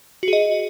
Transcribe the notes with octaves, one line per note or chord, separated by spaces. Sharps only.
F#4 G#4 D#5